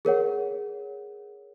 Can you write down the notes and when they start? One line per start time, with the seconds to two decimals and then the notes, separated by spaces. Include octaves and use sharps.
0.05 G#4 A#4 C#5 F#5